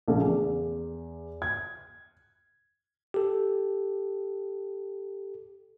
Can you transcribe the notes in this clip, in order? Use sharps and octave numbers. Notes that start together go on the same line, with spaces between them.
A#1 C#3 A3
E2
G#6
G4 A4